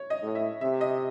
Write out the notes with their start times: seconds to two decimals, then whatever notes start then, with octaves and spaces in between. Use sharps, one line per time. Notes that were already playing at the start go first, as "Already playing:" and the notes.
Already playing: C#5
0.10 D#5
0.23 A2
0.35 E5
0.61 C3 E5
0.81 D#5